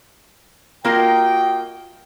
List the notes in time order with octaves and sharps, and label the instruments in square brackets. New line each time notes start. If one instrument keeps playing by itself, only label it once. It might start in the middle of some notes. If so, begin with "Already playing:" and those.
[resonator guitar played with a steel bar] A#3 F4 A#4 [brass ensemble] F#4 D#5 G5